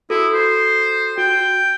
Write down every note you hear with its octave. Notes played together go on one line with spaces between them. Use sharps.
E4 F#4 A4
C5
F#4 G5